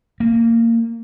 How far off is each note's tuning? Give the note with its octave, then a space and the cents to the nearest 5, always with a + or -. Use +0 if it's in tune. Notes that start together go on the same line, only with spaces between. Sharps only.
A#3 -20